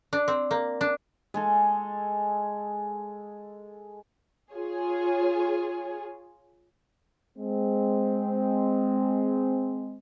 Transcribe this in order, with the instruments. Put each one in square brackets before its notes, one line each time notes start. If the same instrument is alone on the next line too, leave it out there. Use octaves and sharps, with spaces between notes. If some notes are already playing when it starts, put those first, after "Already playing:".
[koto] D4
C4
A#3
D4
[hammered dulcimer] G#3 G#4 A4
[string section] F4 G#4 C#5
[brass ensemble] G#3 C4